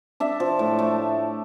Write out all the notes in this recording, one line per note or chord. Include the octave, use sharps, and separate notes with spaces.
D4 E5
F3
A2
A3